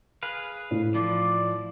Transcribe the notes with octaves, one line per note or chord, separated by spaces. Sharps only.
G#4 B4 F5
A2
E3 F3 D5